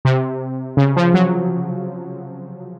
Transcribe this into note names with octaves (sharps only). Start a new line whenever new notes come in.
C3
C#3
F3
F#3